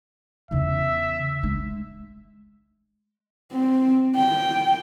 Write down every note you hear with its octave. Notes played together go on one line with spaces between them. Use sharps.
E2 C#3 E5
G#3
C4
G5